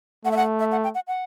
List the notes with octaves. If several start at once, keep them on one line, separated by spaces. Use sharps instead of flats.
A3 F#5
E5
F#5
E5
F#5
G5
F#5
F#5